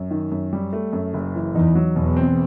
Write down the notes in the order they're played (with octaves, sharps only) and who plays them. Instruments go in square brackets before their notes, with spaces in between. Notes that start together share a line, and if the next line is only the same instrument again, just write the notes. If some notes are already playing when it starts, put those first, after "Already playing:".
Already playing: [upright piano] F#2
D#3
F#2
G3
A3
F#2
F#1
E3
[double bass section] E2 [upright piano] D#4
[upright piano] F#3
[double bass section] E2 [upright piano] B2
[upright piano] C4